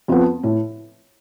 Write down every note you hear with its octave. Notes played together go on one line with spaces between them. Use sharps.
F2 F3 B3
A2